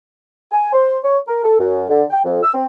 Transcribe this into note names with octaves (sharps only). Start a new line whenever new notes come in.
G#5
C5
C#5
A#4
A4
F#2
D3
G5
F2
E6
C4